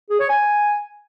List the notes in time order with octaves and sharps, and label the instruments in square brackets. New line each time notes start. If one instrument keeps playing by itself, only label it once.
[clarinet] G#4
C#5
G#5